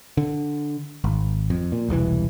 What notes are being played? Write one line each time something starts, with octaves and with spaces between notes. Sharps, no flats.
D3
G#1
F2
A#2
E1 C2 C3 E3